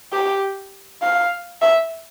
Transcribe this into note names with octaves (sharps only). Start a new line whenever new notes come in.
G4
F5
E5